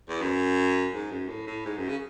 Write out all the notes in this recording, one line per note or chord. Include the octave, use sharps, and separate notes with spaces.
E2
F#2
G#2
F#2
A2
A2
G#2
F#2
C#3